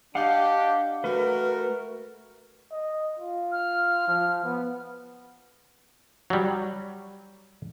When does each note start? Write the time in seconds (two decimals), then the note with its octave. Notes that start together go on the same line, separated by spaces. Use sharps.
0.15 D4 G4 D#5 F5 F#5
1.04 A3 F#4 A#4 B4
2.71 D#5
3.19 F4
3.52 F6
4.08 F3
4.44 B3
6.30 F#3 G3